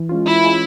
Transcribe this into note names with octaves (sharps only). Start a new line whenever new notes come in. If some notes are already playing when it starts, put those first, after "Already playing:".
Already playing: E3
G#3 C#4 F4
E3 E4
G#3 C#4 F4